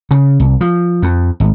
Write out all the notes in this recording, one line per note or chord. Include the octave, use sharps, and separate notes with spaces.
C#3
C2
F3
F2
G#1